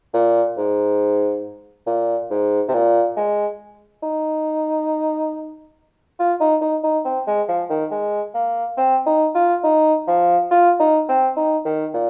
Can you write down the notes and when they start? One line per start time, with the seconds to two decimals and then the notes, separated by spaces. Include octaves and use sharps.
0.14 A#2
0.57 G#2
1.87 A#2
2.30 G#2
2.68 C3
2.74 A#2
3.17 G#3
4.03 D#4
6.19 F4
6.40 D#4
6.61 D#4
6.83 D#4
7.05 C4
7.27 G#3
7.49 F3
7.70 D#3
7.91 G#3
8.34 A#3
8.77 C4
9.06 D#4
9.35 F4
9.64 D#4
10.07 F3
10.51 F4
10.79 D#4
11.09 C4
11.37 D#4
11.65 D#3
11.94 A#2